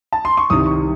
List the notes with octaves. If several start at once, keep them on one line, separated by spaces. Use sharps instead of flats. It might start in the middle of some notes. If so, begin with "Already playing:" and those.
A5
C6
C#6
C2 C3 D#3 D#6
C#6